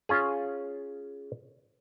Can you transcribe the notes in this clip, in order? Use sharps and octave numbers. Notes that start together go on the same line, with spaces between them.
C#4 F4 G#4